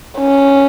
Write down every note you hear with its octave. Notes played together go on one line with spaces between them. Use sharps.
C#4